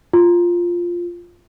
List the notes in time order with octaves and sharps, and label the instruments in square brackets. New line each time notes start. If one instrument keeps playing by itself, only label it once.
[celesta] F4